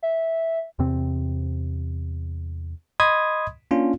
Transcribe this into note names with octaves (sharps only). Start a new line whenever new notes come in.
E5
E2 C3 C4
D#5 B5 C6 D#6 G#6
A#3 C#4 D4 F4